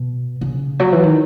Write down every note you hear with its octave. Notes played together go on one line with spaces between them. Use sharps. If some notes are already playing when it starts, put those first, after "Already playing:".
Already playing: B2
C#3
F#3
E3
D#3